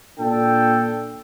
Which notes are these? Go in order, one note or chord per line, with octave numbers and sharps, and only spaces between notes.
A#2 D4 A4 G5